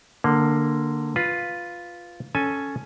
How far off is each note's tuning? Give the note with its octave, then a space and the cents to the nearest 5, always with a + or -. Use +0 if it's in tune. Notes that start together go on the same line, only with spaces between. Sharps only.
D3 +15 A#3 +0
F4 +0 B4 +0
C#4 +0 A4 +0 G#5 +10